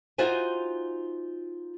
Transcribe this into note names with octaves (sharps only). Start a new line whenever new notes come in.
D#4 F4 F#4 C5 E5 G#5